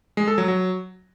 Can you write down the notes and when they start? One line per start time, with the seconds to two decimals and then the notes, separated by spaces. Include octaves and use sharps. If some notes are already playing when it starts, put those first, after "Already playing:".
0.17 G#3
0.28 A4
0.38 F#3
0.48 F#3